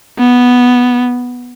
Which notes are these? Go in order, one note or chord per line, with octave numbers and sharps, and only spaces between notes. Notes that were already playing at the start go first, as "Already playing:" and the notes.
B3